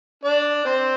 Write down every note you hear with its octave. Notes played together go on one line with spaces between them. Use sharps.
D4 D5
C4 C5